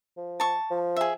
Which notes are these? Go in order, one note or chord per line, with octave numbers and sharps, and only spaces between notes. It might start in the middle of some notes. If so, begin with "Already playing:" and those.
F3
A5 C#6
F3
G#4 E5